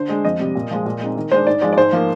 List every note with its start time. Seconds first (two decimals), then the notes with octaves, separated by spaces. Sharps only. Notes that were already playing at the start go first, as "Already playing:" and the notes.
Already playing: D3 C5
0.10 G#3 D4
0.25 F2 D#5
0.39 C3 G3
0.55 A#2
0.71 F3 G#3
0.85 A#2
1.01 G#3 C4 D#4
1.16 D#3
1.32 G#3 D4 C5
1.47 G#2 D5
1.62 F3 G#3 D5
1.73 D5
1.77 G#2 C5
1.93 F3 A#3